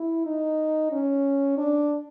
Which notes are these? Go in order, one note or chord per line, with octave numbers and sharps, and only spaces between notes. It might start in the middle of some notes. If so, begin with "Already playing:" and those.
Already playing: E4
D#4
C#4
D4